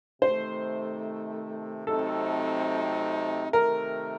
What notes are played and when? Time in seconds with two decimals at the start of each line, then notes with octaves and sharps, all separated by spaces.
0.22 C3 D#3 A3 D#4 C5
1.87 C3 F#3 A3 C4 D#4 A4
3.53 C3 D#3 A3 A#4